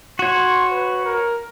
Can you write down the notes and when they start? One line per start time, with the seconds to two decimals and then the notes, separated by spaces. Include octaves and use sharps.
0.19 F#4 C#5 C6
0.70 B4
1.05 A#4